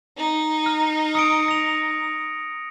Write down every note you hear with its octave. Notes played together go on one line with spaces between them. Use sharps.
D#4
F6
D#6 C#7 D7
A#6 F7